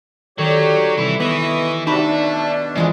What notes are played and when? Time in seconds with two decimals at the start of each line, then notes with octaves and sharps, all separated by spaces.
0.38 D#3 F#3 G4 A4 C#5 D5
0.97 C2 E3 E4
1.20 E3 B3 E4 G4 B4 D#5 C#6 D#6
1.87 C3 G3 D#4 F#4 E5 A5 B5
2.04 B2 D4
2.76 F2 E3 F3 G#3